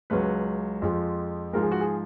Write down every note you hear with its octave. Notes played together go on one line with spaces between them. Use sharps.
C#2 C#3 F#3 B4
F2 F3 G#3
G#2 F3 G#3 A#4
G#4
F#4
G#4